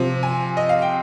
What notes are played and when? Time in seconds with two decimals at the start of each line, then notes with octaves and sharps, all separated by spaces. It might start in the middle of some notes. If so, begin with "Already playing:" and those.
Already playing: C3 F3
0.23 G#5
0.57 D#5
0.69 F5
0.82 G5